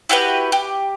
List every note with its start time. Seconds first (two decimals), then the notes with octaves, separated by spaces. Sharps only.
0.09 E4 F#4 G4 B4
0.52 G4